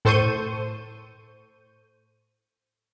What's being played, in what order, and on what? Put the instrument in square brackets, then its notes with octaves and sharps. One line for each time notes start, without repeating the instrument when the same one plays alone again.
[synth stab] A2 A4 C5 C#6 G6 D#7